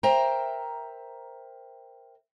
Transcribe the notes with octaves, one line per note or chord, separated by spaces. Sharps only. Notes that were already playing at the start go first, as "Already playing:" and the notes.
A#4 C5 E5 G5 A#5